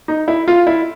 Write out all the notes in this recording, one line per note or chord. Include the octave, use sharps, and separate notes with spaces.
D#4
E4
F4
E4